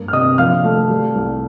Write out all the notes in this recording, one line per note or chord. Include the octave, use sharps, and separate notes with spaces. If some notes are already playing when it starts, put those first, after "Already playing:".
Already playing: G2 A#3
F6
C3 D#5 D#6
A#1 F5 F6
A3
G3
C2